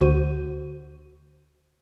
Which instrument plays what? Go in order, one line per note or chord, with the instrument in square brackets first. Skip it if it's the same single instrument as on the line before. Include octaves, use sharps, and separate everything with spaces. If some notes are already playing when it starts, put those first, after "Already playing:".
[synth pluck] D2 D3 F#4 C5 G6 D#7